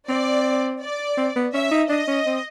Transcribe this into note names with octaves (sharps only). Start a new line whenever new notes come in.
C4 D5
D5
C4
B3
C#4 E5
D#4
D4 D#5
C#4
C4